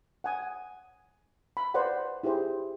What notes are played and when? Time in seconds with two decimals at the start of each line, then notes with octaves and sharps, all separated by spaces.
0.24 F#5 G#5 D#6
1.57 B5
1.74 B4 C5 D5 F#5
2.23 E4 G4 G#4 C5